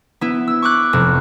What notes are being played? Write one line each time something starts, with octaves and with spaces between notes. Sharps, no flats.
B3 E4
E6
C#6 D6 F#6
F1